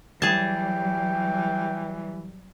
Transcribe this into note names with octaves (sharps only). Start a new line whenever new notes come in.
E3 F#3 G3 G#4 G5 A5